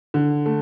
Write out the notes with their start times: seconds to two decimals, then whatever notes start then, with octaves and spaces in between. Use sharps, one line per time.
0.14 D3
0.46 A3